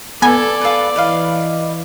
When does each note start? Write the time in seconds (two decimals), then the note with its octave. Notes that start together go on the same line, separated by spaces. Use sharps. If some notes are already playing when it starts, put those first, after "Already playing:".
0.22 B3 A4 D5 G#5
0.61 F4 B4
0.96 E3 B4 D#5 F5